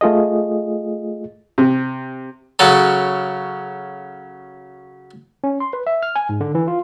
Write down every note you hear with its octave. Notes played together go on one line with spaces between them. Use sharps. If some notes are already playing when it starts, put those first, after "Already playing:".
A3 F4 G#4 D#5
C3
C#3 F#3 C#4 A4
C#4
C6
B4
E5
F6
G#5
G#2
D3
E3
F4